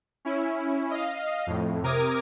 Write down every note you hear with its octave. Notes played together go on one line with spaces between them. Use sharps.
C#4 E4
D#5 F5
F2 A2
C3 A#4 D6 D#6 G#6